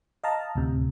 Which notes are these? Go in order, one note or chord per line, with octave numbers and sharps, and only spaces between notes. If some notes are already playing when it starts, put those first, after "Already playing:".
D#5 F5 A5 A#5
D2 A2 C3